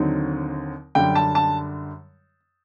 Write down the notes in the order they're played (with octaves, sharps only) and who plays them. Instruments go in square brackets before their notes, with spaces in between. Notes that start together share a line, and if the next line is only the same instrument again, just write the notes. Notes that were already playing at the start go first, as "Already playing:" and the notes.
Already playing: [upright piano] D#2 D3 F#3 C4 D#4
F#2 D3 G3 G5
A5
A5